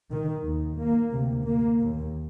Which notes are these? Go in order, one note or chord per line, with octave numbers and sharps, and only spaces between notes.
D#3
D#2
A#3
D2 C3
A#3
D#2